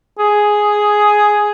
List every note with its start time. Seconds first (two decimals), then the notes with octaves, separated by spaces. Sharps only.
0.19 G#4